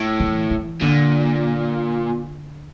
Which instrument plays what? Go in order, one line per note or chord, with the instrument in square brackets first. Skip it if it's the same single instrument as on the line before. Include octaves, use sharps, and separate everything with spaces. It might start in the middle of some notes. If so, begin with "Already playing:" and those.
Already playing: [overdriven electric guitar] A2
[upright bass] E3
E3
[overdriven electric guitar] A#2 [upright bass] D3